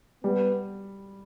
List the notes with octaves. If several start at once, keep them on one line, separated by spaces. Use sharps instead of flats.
G3 B3